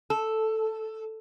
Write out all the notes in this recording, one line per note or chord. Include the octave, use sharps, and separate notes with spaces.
A4